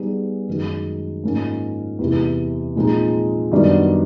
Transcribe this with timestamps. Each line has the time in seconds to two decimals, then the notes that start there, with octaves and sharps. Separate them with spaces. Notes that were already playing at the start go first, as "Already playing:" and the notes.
Already playing: G3 B3 D#4 G#4 B4
0.47 F#2 D#3 G#3
1.23 G#2 F3 A#3 C#4
1.99 E2 C3 E3
2.76 A#2 F3 G#3 C4 D#4
3.51 F#2 D#3 G3 B3 D4